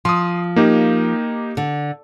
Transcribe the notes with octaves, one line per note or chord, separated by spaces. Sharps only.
F3 C6 D#6
A#3 D#4 G4
D3